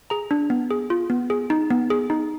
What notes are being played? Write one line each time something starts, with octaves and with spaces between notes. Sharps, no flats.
G#4 A#5
D4
B3
G#4
F4
B3
G#4
D#4
B3
G#4
D#4